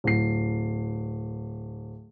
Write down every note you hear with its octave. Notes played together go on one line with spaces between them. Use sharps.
D1 C7